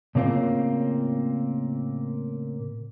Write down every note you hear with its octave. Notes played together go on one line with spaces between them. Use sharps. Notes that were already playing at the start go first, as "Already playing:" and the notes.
A2 C#3 A#3 C4 F4